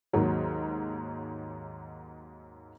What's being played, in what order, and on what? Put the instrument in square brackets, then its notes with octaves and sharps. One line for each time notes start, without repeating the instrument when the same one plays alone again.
[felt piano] D#2 G#2 F#3